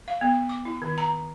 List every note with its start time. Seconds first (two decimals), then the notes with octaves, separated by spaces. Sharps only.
0.08 F5
0.21 B3
0.49 D6
0.65 E4
0.82 D#3
0.98 A#5